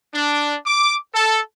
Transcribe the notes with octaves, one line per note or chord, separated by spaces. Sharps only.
D4
D6
A4